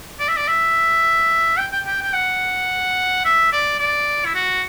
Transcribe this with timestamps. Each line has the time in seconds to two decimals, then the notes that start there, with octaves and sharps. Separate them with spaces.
0.20 D5
0.29 E5
0.37 D5
0.48 E5
1.58 G5
1.73 G5
1.87 G5
2.02 G5
2.13 F#5
3.25 E5
3.52 D5
3.79 D5
4.25 E4
4.35 F#4